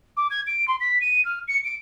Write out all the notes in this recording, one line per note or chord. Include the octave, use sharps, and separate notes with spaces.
D6
G#6
D7
C6
B6
D#7
F6
C#7
D7